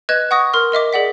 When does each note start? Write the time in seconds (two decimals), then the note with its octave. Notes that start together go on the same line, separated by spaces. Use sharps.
0.09 B4 D#5 F#6 G#6 E7
0.31 F#5 C#6 D#6 A#6
0.53 A#4 C6 F6
0.72 A#4 D#5 E5 D6
0.93 G#4 D5 F#5 B6